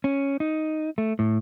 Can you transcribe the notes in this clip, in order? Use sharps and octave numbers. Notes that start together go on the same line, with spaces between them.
C#4
D#4
A3
A2